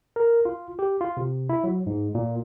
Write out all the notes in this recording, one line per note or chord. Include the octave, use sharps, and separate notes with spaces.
A#4
F4
G4
F4
C3
E4
F#3
G#2
A#2